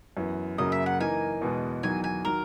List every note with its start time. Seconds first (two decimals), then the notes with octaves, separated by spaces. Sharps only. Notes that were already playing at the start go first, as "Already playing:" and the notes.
0.17 F#2 E3 B3
0.58 F#2 C#3 F#3 A#3 D#5
0.72 E5
0.86 F#5
1.00 E3 A#3 D#4 A#4 G#5
1.41 E2 B2 G#3 B3
1.83 E2 D#3 F#3 G#5
2.04 G#5
2.25 D#3 F#3 A#4